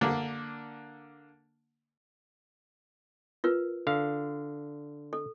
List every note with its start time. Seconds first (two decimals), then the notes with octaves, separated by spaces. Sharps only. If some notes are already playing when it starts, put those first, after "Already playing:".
0.01 D3 A#3 D4
3.44 F4 A#4 B4
3.87 D3 F5
5.13 A4